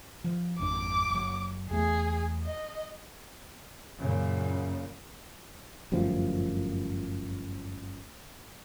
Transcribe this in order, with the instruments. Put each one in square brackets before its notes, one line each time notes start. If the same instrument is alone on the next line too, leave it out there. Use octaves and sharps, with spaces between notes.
[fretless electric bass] F3
[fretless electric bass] G#1 F2 D4 [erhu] D6
[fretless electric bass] F#1 F#3
[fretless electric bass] E2 A3 [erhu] G#4
[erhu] D#5
[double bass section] F#2 A#2 C#3
[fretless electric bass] G1 F#2 A2 F3